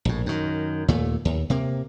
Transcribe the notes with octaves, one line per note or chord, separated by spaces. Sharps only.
A#1 A2
F#2 D#3
D#2 A#2 A3
D#2
C3 A#3